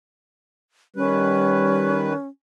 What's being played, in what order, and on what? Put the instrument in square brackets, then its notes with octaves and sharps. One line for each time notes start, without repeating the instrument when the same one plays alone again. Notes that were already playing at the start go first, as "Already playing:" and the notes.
[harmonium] D#3 B4 [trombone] G3 [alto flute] C#4